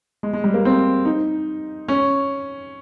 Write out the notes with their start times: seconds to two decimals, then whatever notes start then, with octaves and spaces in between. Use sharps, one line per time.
0.23 G#3
0.33 G#3
0.44 G3
0.54 A#3
0.65 C4
1.05 D#4
1.88 C#4